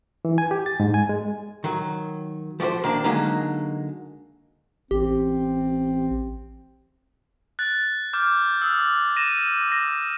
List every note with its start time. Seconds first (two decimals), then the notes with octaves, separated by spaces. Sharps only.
0.25 E3
0.38 G#5
0.51 G4
0.66 A6
0.80 G#2
0.94 G#5
1.09 G#3
1.64 D#3 F#3
2.60 F3 F#4 G4 C5
2.84 D#3 A#3 D4
3.04 D3 F#3 G#3 A#3 D#4
4.91 A1 C4 G4
7.59 F#6 A6
8.13 D6 F6 G6
8.62 D#6 E6
9.17 A#6 D#7 E7
9.72 A#6